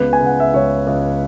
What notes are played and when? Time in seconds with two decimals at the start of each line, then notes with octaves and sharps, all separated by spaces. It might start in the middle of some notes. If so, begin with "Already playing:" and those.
Already playing: C#2 B3 B4
0.13 G#5
0.20 C#2
0.26 F#5
0.40 E5
0.54 C#2 C#5
0.87 C#2